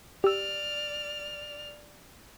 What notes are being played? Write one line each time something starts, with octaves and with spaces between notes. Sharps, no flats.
G4 D5 E6 F6